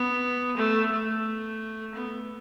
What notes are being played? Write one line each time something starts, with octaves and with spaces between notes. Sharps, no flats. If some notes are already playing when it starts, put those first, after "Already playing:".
Already playing: B3
A3
A3
B3